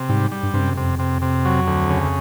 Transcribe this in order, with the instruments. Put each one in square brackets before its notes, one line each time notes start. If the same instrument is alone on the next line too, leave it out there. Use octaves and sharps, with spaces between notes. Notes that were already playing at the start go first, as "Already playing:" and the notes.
Already playing: [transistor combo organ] C3
[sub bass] G#2 [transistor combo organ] G3
[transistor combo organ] G3
[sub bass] G2
[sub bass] G2 [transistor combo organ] C3
[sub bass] F#2
[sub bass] F2 [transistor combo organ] C3
[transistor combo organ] C3
C3
F#3
D2
C#3